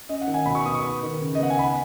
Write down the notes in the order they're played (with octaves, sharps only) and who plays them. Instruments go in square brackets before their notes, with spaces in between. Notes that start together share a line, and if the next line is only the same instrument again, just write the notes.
[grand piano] C#4 D#5
F#5
D#3
G#5
B2 B5
C#6
B3 D#6
C#6
B3
D#3
C#3
D#5
B3 F#5
G#5
B3 B5